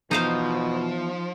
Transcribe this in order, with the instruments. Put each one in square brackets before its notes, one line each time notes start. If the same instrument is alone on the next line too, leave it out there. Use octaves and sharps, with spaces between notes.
[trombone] B2 [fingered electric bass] E3 B3 [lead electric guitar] F3 [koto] D#4 C5 F5